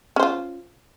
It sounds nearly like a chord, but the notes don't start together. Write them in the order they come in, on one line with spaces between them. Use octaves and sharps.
C#4 C5 F4